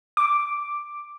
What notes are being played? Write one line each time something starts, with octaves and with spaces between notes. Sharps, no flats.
D6